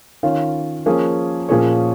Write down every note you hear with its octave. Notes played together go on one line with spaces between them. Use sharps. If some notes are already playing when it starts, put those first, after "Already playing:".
D#3 C#4 F4
F3 A#3 C#4 G#4 C#5
A#2 F3 C#4 G#4 C#5